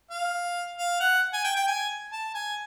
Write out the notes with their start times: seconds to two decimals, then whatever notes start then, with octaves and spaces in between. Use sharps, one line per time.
0.11 F5
0.78 F5
1.00 F#5
1.33 G#5
1.44 G5
1.56 G5
1.67 G#5
2.12 A5
2.35 G#5